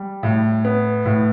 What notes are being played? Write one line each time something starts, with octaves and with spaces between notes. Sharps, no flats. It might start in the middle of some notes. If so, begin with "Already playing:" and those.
Already playing: G3
A2
B3
A2